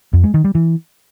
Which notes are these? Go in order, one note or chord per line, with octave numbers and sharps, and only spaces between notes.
F2
G#3
D#3
G3
E3